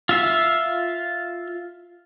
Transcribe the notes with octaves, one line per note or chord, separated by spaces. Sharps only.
F4 E5 F5